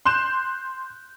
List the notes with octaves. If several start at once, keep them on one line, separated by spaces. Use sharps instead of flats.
C6 F#6 G6 E7